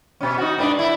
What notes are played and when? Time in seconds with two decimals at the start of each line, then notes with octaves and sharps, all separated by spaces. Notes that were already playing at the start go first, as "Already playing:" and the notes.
0.21 B2 C#4
0.38 D#4 F#4
0.58 G#2 D4 B4
0.79 E4